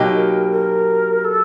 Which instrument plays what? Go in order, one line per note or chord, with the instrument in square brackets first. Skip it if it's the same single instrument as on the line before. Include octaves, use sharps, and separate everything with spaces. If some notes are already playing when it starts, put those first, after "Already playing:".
Already playing: [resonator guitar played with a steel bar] B2 F#3 A#3 D#4 G4
[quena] A#4
A#4
A4